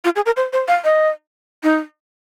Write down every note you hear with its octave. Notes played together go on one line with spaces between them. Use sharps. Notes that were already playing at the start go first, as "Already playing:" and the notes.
F4
G#4
A#4
C5
C5
F5
D#5
D#4